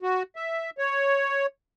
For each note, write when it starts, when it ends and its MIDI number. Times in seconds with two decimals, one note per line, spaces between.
0.02 0.23 66
0.36 0.70 76
0.78 1.46 73